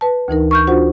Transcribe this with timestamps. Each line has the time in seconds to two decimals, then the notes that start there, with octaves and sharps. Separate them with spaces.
0.01 B4 A5
0.28 D2 E3 D#4 A#4
0.51 C#6 F6 G6
0.67 D4 F4 F#4 C5 F#5